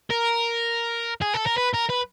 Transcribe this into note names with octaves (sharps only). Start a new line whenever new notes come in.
A#4
G#4
A4
A#4
B4
A#4
B4